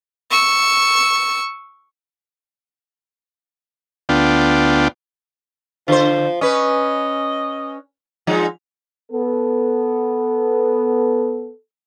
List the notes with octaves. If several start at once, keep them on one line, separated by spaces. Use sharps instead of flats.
C#6 E6
D2 B3 D4 F4 G5
D3 F3 C5
C#4 B4 D#5
F3 G#3 D#4
B3 A4